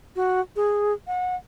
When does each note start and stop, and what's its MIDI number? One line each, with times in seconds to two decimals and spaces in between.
0.16 0.41 66
0.56 0.93 68
1.07 1.36 78